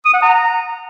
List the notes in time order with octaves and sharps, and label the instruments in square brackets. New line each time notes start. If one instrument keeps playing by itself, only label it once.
[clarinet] D#6
F#5
A#5